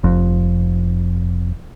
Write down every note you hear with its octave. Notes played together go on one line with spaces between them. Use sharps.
F1 F2